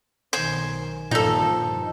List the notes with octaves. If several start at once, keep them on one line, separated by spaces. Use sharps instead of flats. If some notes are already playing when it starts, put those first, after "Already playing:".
B1 D#3 C5 G#5
G2 A#2 D#3 F3 D#4 A4
D#3